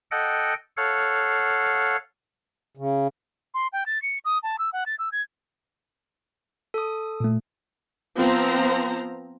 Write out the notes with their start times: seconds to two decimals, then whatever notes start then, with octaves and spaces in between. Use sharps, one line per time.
0.11 A4 D#5 F#5 G5
0.77 A4 C#5 F5 F#5
2.77 C#3
3.54 C6
3.73 G5
3.86 A6
4.02 C#7
4.25 D#6
4.43 A5
4.59 E6
4.73 F#5
4.86 A6
4.99 E6
5.12 G#6
6.74 A4 D#6
7.20 A#2 A3
8.16 F3 B3 C4 C5 A#5